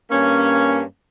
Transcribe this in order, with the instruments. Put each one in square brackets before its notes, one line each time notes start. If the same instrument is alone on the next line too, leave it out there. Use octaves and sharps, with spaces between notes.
[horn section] G2 A#3 C#4